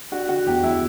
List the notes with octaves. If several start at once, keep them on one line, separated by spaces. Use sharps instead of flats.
D4 F#4
D3 F#4
E2 G4
E2 E4